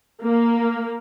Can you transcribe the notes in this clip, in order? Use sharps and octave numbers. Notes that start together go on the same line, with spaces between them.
A#3